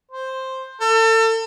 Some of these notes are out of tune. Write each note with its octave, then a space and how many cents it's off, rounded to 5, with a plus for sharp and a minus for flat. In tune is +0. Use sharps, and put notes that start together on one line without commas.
C5 +5
A4 +35